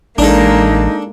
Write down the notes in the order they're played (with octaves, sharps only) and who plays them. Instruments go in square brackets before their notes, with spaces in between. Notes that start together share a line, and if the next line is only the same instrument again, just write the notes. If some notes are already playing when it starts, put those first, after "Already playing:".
[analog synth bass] A1 [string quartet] G#3 A#3 [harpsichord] D4 A4 [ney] D#4